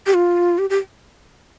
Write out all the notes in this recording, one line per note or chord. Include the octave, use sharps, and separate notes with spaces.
G4
F4
G4
G4